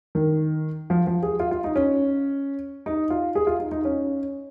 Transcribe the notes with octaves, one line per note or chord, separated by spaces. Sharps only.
D#3
F3
F3
G#4
F4
F4
D#4
C#4
D#4
F4
G#4
F4
D#4
D#4
C#4